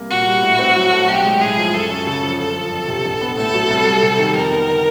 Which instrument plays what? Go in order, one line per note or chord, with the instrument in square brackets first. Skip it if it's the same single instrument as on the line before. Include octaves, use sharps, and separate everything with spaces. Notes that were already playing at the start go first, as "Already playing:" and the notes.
Already playing: [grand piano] C2 A#3
[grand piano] A#2 [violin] F#4
[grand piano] G3
A2
C4
F#3
A3
[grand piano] B1 [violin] G4
[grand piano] G#3
[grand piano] A2 [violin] G#4
[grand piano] F3
[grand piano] F#2 [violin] A4
[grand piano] F#2
C#3
F3
[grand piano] G1 [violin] A4
[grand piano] F3
F2
C3
A#1
B3
[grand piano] A2 [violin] A4
[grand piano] F#3
C2
G3
C3
D#3
[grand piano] F2 [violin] A#4
[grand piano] B3
D3